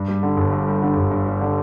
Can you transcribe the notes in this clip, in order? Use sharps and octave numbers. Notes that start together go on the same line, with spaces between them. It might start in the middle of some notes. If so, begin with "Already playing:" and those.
Already playing: G2
G3
D3
G1
G2
G3
D3
G1
G2
G3
D3